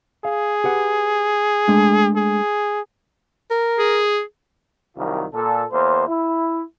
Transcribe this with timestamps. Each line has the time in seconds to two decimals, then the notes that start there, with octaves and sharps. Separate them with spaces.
0.25 G#4 F5
0.64 G4 B4 F#5
1.68 G#3 A3 D4
2.16 G#4
3.51 A#4
3.79 G#4
4.97 C2 D#3 F#3 F4 A#4
5.33 A#2 A4
5.72 E2 A#3 C5
6.07 E4